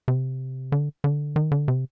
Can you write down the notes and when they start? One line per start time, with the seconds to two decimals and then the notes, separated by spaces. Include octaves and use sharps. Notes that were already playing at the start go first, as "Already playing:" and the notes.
0.08 C3
0.72 D3
1.04 D3
1.36 D#3
1.52 D3
1.68 C3